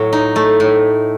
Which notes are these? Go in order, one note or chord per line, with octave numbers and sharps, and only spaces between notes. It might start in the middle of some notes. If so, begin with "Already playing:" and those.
Already playing: A2 F#3
D#4
A3
A2